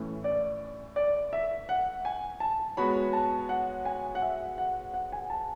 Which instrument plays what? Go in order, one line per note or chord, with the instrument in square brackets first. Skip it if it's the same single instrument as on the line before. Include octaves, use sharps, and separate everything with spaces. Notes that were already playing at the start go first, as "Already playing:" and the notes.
Already playing: [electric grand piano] A2 E3 A3 C#4
[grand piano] D5
D5
E5
F#5
G#5
A5
[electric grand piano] G#3 B3 F#4 C#5 [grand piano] B5
[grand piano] A5
F#5
G#5
F#5
E5
F#5
F#5
G#5
A5